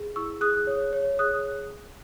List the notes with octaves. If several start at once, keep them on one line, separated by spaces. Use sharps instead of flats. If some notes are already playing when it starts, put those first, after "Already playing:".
Already playing: G#4
E4 C#6 E6
G#4 D#6 F#6
C#5
C#5
G#4 D#6 F#6